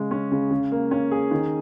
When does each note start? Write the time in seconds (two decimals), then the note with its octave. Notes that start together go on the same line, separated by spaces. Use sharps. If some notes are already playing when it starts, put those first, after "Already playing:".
Already playing: C#3 G#3
0.11 C#4
0.31 C#3
0.51 C#3
0.72 A#3
0.91 C#4
1.11 G#4
1.31 D#3